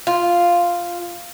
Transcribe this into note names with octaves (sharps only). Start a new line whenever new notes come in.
F4